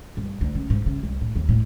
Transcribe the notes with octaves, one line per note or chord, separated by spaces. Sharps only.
G2
D2
C#3
G#2
C#3
C2
A2
D#2
A2